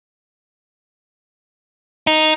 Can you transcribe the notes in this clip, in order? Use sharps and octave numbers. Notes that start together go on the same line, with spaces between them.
D#4